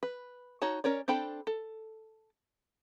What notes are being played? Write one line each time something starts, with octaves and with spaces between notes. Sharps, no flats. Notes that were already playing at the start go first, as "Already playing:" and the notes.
B4
D#4 F#4 C#5 A5
C#4 A#4 C#5 D5
C4 D4 A4 G5 B5
A4